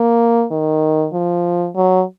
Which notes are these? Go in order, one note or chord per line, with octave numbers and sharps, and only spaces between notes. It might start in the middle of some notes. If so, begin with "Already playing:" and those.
Already playing: A#3
D#3
F3
F#3